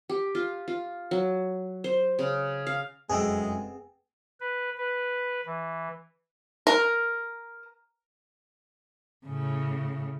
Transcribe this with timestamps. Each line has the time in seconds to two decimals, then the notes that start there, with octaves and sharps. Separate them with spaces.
0.09 G4
0.35 F4
0.68 F4
1.11 F#3
1.84 C5
2.19 C#3
2.67 F5
3.09 F1 F#2 G#3 B3 C4 G#4 G5 E6
4.40 B4
4.78 B4
5.46 E3
6.67 A#4
9.27 A2 C#3